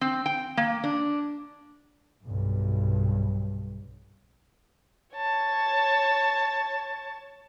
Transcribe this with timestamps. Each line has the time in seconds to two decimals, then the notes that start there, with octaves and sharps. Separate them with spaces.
0.01 C4
0.26 G5
0.57 A#3
0.84 D4
2.23 B1 G2
5.16 C#5 A5